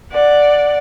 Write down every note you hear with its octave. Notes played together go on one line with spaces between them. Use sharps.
D5 F#5